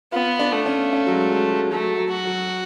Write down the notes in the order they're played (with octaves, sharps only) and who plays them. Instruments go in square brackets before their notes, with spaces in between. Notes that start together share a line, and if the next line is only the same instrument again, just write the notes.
[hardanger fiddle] B3 [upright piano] F4
[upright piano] D4
[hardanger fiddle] A3
[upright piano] C#4
C#4
F#3
G#3
G#3
F#3
[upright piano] F#3 [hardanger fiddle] A3
[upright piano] F#3
[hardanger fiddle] F#4
[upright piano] F#3